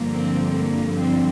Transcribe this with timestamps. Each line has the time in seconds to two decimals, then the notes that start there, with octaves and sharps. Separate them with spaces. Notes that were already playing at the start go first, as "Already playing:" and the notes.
Already playing: G2 D3 F3 A#3
0.15 C4
0.57 A#3
0.98 C4